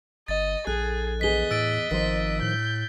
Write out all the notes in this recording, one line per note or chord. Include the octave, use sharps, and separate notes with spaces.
G1 D#5 A6
A#1 G#4 A4 F#6
E2 G#4 D#5 B6 G7
A2 E6 A6 D7
G#1 D#3 F3 C5 B6
A2 G6